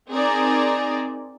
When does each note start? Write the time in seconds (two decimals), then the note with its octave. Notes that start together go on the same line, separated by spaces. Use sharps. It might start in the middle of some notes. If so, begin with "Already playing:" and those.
0.10 C4 D#4 G#4 A#4 D5